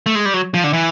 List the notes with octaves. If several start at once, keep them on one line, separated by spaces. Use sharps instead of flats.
A3
G#3
G3
F#3
F3
D3
E3